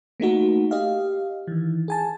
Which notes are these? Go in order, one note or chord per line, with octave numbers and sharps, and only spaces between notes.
A3 A#3 D#4 F#4
G4 D#5 F5
D#3 E3
G#4 G#5 A5